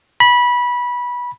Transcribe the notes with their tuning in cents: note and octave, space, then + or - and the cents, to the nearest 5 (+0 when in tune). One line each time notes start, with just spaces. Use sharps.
B5 -20